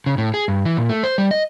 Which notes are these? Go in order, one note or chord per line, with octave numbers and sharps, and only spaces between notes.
C#3
A2
G#4
G2
E3
A#2
A3
C5
G3
D#5